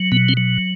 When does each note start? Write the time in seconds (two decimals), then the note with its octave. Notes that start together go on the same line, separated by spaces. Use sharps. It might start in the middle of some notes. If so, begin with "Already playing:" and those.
Already playing: F#3
0.12 B2 B3
0.29 C4
0.37 F#3